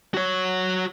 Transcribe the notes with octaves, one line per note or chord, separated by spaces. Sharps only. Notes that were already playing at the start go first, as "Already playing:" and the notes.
F#4 C#5